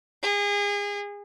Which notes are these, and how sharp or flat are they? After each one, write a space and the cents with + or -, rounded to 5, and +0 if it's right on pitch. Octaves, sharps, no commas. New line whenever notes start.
G#4 -35